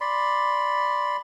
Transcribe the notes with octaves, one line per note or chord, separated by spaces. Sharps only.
D5 B5 C6